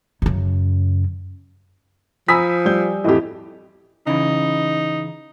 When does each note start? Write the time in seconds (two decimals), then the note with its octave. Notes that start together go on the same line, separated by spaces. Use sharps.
0.22 F#2 C#3
2.28 F3 G#5 A#5 B5 D#6 E6 B6
2.66 G3 G6
3.04 F2 A2 E3 G4 D#5
4.07 C#3 E3 D#4